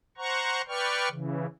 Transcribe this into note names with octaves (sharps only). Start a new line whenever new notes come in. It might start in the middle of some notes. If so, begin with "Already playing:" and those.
C5 F#5 A#5 C#6
B4 D5 G5 C#6 F6
C#3 E3